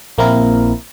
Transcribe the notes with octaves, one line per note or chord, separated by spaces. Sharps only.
A#1 A#3 C4 E4 A#4